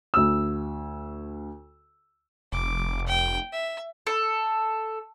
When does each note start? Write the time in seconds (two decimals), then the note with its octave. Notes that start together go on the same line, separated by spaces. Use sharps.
0.14 D2 E6
2.52 F1 D6
3.07 G5
3.53 E5
4.07 A4